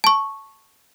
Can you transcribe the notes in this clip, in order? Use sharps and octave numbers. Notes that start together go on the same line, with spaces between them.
A5 C#6